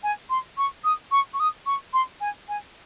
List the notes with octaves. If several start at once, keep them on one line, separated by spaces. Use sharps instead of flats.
G#5
C6
C#6
D#6
C#6
C#6
D#6
C#6
C6
G#5
G#5